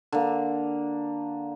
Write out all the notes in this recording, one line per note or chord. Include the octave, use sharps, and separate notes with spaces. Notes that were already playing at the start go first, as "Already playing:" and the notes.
D3 A#3